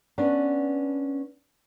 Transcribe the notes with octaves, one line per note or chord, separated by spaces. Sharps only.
B3 C#4 D4